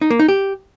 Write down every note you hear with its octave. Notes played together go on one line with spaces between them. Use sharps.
D#4
A#3
D#4
G4